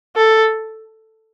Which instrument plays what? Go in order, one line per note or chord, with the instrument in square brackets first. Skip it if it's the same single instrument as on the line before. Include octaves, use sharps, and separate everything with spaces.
[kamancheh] A4